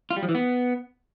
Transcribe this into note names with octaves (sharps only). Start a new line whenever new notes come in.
F4
G3
F3
E3
B3